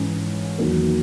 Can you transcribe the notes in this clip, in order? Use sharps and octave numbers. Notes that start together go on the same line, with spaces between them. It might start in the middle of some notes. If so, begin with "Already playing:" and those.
Already playing: G#2 E3 G#3 C#4
E2 D#3 F#3 A#3